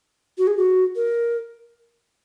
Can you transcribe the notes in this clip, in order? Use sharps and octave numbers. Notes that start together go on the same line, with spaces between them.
F#4
G#4
F#4
A#4